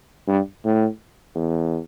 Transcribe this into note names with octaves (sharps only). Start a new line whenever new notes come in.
G2
A2
E2